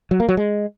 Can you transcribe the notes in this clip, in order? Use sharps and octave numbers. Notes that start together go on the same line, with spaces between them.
F#3
A#3
F#3
G#3